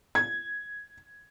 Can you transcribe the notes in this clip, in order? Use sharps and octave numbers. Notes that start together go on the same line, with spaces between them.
G#6